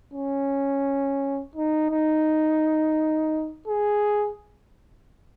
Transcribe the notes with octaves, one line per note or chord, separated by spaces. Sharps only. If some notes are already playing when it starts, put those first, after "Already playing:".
C#4
D#4
D#4
G#4